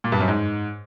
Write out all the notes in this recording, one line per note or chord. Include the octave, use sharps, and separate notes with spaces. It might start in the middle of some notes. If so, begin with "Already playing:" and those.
A#2
G2
F#2
G#2